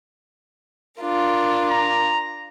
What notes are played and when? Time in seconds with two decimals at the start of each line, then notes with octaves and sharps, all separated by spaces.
1.00 D4 F4 A#4
1.71 A#5